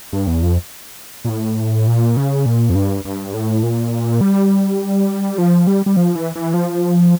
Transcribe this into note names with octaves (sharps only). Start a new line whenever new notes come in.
G2
E2
F2
A#2
A2
A#2
C#3
A#2
F2
G2
G2
A2
A#2
G3
F3
G3
G3
F3
E3
E3
F3